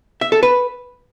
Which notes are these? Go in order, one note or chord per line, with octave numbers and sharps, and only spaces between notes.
E5
A4
B4